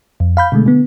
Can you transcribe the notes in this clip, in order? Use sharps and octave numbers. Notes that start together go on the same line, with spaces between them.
F2
F5 B5 G6
B2 D3 G#3 A3
D3 B3